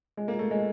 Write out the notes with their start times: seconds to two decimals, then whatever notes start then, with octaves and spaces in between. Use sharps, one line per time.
0.17 G#3
0.28 A#3
0.39 A3
0.51 G#3